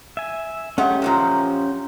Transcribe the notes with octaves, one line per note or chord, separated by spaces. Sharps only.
E5 G#5
G#3 A3 C#4 G4 F#5
F#2 A#2 F3